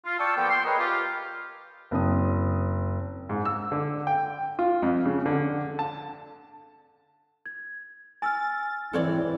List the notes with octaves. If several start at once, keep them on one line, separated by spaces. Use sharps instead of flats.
F4
D5 G5 A5 C#6 E6
F3 A#3 B3 A4 G5
G5 C6
G#4 A#4 B4 C#5 D#5
F4 G4
F#1 C4 D#6
G#2
E6
D3
G5
F4
F2
C#3
D3
A5
G#6
G#5 E6 F6 A6
G#2 E3 C4 A4 C#5 D5